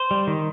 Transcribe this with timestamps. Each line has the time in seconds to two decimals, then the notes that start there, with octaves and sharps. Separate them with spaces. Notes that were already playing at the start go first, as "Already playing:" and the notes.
Already playing: C5
0.11 G3
0.27 D#3